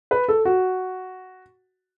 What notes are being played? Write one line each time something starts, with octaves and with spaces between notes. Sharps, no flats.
B4
A4
F#4